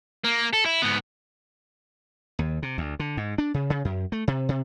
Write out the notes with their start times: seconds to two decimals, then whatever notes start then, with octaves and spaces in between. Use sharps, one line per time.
0.24 A#3
0.53 A4
0.65 E4
0.82 G#2 B3
2.39 D#2
2.63 C3
2.78 D2
3.00 D3
3.17 G#2
3.38 D4
3.54 C#3
3.70 C#3
3.85 F#2
4.12 A3
4.28 C3
4.49 C3